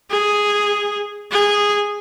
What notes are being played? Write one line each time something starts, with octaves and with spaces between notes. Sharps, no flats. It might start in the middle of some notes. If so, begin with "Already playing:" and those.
G#4
G#4